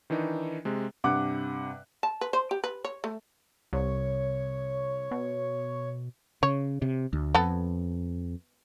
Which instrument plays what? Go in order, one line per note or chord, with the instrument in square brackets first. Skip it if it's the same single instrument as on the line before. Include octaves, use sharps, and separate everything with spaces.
[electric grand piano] D#3 E3 D4 D#4
C3 G#3
[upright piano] G2 C3 F#5 D6 F#6
[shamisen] A5
B4
C5
G4
B4
C#5
A3
[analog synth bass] C2 [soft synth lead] C#5
[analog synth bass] B2
[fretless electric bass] C#3 [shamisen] C#5
[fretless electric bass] C3
D2
[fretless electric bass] F2 [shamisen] B3 A4